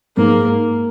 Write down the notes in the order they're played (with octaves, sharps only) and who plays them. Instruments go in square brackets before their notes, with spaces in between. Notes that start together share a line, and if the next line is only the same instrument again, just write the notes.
[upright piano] G#2 [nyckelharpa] A#3